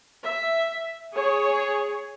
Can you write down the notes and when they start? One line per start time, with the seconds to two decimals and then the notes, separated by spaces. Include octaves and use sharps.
0.25 E5
1.14 G#4 C#5